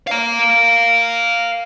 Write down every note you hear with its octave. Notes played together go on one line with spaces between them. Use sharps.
F5 A#5